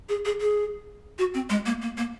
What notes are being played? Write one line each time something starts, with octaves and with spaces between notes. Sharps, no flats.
G#4
G#4
G#4
F#4
C4
G#3
A#3
A#3
A#3